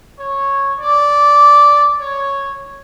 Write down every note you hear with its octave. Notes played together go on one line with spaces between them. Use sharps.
C#5
D5
C#5